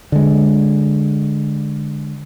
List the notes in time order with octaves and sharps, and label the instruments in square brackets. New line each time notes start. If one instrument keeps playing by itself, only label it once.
[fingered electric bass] D3 G#3